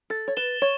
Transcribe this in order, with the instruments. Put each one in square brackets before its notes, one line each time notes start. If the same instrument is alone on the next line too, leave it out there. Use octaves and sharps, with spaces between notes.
[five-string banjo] A4 [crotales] A6
[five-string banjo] C#5
[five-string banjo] B4 [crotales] E7 G7
[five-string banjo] C#5 [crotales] C#6